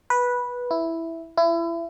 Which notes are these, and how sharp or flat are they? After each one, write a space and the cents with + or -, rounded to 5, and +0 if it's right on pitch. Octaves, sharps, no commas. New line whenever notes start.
B4 -10
E4 +0
E4 +30